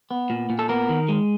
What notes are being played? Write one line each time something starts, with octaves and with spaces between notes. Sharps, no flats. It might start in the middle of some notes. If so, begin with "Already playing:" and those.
B3
A#2
A#2
A4
B3 A#4
D#3
G#3